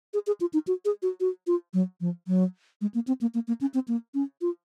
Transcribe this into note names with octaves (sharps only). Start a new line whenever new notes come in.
G#4
G#4
F4
D#4
F#4
G#4
F#4
F#4
F4
F#3
F3
F#3
G#3
A#3
C4
A#3
A#3
A#3
C#4
C4
A#3
C#4
F4